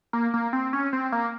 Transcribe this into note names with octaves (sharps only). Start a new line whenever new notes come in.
A#3
A#3
C4
C#4
C4
A#3